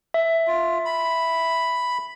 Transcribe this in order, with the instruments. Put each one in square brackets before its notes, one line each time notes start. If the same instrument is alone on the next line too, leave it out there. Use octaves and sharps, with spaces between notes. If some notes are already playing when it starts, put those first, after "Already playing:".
[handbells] E5
[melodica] F4
B5